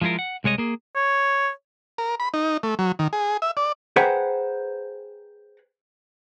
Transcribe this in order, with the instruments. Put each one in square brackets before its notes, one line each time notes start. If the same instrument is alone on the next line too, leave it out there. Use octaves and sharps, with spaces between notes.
[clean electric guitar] F3 G#3 E4 F4 A#4
F#5
C2 G#3 C#5 D#5
A#3 G#4
[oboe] C#5
[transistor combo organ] A#4
B5
D#4
A3
F#3
D#3
G#4
E5
D5
[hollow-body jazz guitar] G#4 B4 C5 F#5 G5 A#5